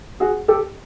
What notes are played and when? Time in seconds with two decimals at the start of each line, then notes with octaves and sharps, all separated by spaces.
0.20 F#4 G#4
0.48 G4 A4